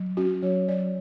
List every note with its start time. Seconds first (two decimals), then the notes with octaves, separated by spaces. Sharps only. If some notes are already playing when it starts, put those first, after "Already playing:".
Already playing: F#3
0.17 C#4 F#4
0.42 F#3 C#5
0.68 F#3 D5